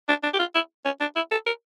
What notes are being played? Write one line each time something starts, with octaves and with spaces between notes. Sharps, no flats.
D4
D4
G4
F4
E4
C#4
D4
E4
A4
A#4